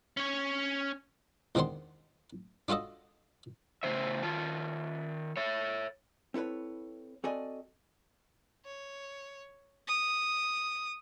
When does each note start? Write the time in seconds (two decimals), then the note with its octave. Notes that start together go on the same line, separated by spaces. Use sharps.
0.17 C#4 C#5
1.55 E2 D#3 C4 D4 F#5 C6
2.68 D4 F4 F#4 A4 D#5
3.83 A2 C#3 C5 E5
4.23 D#3 F4 A5
5.37 C#5 E5
6.34 C4 E4 A4 B4 C#5
7.24 C4 F#4 A4 D5 D#5 G#5
8.65 C#5
9.87 D#6